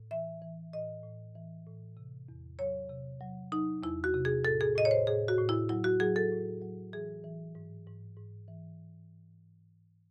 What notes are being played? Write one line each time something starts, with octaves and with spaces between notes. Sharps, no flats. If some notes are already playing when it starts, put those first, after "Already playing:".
Already playing: A2
E3 E5
E3
A2 D#5
A2
E3
A2
C3
E2
F#3 C#5
C3
F#3
F#3 D#4
E2 E4
F#4
C3
G#4
A2 A4
G#4
A2 D#5
C#5
C5
A2 G#4
F#4
A2
E4
F#3 E4
F#4
F#3 G#4
A4
A2
F#3
E3 G#4
E3
G#2
G#2
G#2
E3